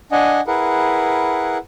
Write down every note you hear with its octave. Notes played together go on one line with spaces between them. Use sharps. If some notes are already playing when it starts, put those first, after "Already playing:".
D4 D#5 F#5 G#5
E4 G#4 A#4 B4 F#5